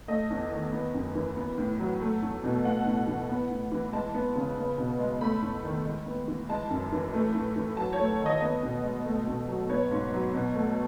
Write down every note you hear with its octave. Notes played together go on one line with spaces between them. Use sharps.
A3 D#5
E2
D#3
B3
F#2
E3
B3
A2
F#3
A3
E2
B2
A3 F#5
A2
E3
B3
A2
E3
G#3 A5
B3
C#3
B3
B2
G#3
A3 B5
E2
D#3
G#3
B3
E3
G#3 A5
F#2
E3
A3
A2
E3
F#3 A5
C#5
A3
A4
D#3
D#5
B3 D#5
B2
G#3
A3
B2
F#3
B3 C#5
G#2
F#3
B2
A3